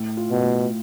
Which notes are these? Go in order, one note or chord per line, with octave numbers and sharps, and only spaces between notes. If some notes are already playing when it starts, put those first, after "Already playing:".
Already playing: A2
F4
B2
A2